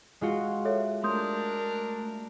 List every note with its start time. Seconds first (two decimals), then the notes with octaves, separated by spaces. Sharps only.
0.21 G#3 F4 F#4
0.65 A4 C#5 E5
1.03 A3 D4 A#4 C6 D#6 G6